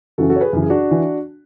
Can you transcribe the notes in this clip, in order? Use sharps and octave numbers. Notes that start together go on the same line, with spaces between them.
F#2 C#3 E3 F#4 A4
F#4 A4
C#5
G#4 B4
F#2 C#3 E3
G#4
D4 F#4
E3